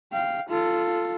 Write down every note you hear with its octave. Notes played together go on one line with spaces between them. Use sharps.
F5 G5
F4 A4